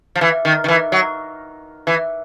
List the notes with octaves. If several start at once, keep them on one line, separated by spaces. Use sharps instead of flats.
F3
E3
D#3
D#3
E3
F#3
E3